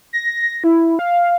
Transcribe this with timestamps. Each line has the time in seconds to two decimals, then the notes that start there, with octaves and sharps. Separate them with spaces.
0.13 A#6
0.64 E4
0.99 F5